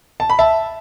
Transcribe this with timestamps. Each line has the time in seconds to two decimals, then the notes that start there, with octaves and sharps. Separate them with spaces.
0.20 A5
0.30 B5
0.39 E5 A5